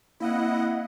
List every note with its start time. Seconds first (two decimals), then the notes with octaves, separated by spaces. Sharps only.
0.20 A#3 C4 E4 D#5 F5 F#5